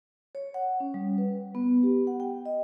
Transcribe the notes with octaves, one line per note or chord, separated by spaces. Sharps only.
C#5
F#5
C#4
G3
B4
B3
G4
F#5
G5
D#5